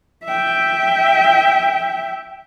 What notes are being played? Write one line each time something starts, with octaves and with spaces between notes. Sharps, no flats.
E5 G5